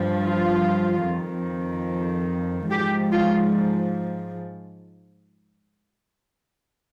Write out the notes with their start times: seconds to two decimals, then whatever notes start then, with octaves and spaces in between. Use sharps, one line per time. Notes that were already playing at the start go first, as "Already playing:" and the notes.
Already playing: G2 F3
0.23 F4
1.06 F2 D#3
2.70 G#2 F3 G4
3.12 F4